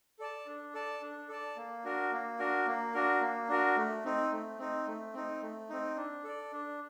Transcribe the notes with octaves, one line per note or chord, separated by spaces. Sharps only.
A4 D5 A5
D4
A4 D5 A5
D4
A4 D5 A5
A#3
D4 F#4 A#4
A#3
D4 F#4 A#4
A#3
D4 F#4 A#4
A#3
D4 F#4 A#4
A3
C4 D#4
A3
C4 D#4
A3
C4 D#4
A3
C4 D#4
D4
A4 D5
D4